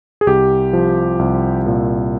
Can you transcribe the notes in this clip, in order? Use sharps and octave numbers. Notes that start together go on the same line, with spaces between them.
G#4
C2 G4
F3
C2
A#2